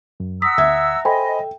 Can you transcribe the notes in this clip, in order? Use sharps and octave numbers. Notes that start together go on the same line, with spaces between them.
F#2
F#5 A#5 D#6 E6 B6
D2 E5 G#6
A4 C5 D#5 G5 G#5 B5